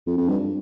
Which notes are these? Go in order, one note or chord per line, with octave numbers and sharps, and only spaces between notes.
F2
F2
G2